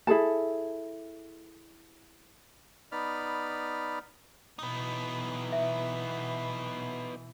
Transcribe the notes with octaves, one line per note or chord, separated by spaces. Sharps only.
E4 G#4 A4 A5
B3 D#4 D5 B5 F6
B2 E3 B3 D#4
E5